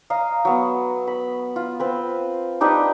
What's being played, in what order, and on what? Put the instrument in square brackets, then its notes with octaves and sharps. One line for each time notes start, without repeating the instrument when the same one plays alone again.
[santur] D#5 F5 A#5
F#3 B3
B5
F4
C4 B4
D4 D#4 G4 B4